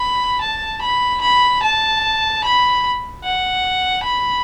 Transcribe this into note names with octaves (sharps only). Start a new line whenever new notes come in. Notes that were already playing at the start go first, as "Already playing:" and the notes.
Already playing: B5
A5
B5
B5
A5
B5
F#5
B5